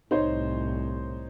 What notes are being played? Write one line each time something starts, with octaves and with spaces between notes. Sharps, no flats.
C2 A2 D#4 C5 C#5